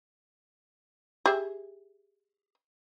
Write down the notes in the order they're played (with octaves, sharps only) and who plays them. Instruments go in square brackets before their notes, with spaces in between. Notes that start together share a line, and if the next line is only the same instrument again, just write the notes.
[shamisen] G4 G#4 E5